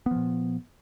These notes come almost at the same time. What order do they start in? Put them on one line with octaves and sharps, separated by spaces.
B3 F3 A#2